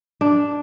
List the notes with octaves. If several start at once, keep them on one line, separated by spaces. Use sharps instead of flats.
D4